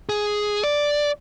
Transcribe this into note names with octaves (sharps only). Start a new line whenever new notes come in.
G#4
D5